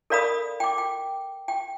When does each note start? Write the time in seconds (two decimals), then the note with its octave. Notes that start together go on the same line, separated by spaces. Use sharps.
0.10 A4 A#4 D5 F5 B5 D#6
0.60 G5 D6
0.78 G5
1.48 G5